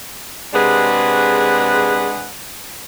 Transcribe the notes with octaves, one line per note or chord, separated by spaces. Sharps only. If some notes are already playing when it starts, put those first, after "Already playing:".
C3 G#3 D4 G#4 B4 F#5